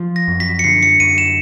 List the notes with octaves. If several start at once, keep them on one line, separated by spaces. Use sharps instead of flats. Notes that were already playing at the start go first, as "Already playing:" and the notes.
Already playing: F3
A#6
F#2
B6
C#7
D3 C7
C#7
F#2 D#7
E7